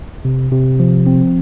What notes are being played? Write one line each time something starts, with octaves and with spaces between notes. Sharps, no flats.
C3
C3
F3
C4